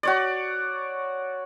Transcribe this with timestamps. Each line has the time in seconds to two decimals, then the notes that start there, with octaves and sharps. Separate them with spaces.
0.03 F#4 C#5 D5